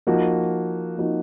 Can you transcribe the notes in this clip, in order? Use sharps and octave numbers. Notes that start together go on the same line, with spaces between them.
F3 A#3 D#4 F#4
F3 A#3 D#4 F#4